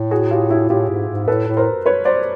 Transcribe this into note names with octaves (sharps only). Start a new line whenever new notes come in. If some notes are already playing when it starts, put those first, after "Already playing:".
Already playing: A2
F#4 G#4
F4 G4
E4 F#4
A2 F4 G4
G#2
G#2
A2 A4 B4
A2
A#4 C5
B4 C#5
C5 D5